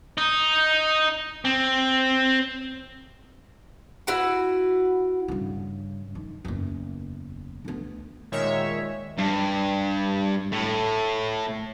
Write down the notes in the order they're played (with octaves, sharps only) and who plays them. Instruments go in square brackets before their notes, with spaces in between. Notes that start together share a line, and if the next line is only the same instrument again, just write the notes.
[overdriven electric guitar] D#4 D#5
C4
[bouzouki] E4 F#4 B4 F#5
[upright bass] G2 C#3
D#3
F#1 E2
D2 B3
[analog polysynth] A#2 D#3 G#3 C#5 E5
[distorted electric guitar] G2
A2